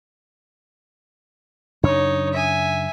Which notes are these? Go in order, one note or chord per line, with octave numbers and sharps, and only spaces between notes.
F#2 C#3 D4 D#4 C#5
E5 G#5